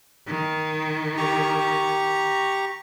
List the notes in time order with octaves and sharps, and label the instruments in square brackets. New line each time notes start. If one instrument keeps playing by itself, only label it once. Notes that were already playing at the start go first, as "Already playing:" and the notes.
[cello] D#3
[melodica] G4 A#5 C#6